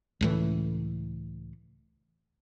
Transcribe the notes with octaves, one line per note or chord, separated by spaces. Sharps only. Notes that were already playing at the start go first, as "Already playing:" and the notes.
C#2 A2 E3